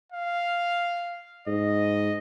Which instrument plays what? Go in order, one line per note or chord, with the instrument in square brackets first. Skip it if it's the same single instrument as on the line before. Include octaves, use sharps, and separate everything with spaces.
[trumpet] F5
[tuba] G#2 [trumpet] D#5